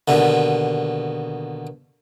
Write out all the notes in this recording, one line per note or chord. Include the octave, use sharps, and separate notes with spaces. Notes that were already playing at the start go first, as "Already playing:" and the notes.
D#2 B2 D3